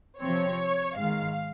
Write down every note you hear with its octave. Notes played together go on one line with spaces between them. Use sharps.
C3 F3 C4 C#5
G#2 D#3 G#3 F5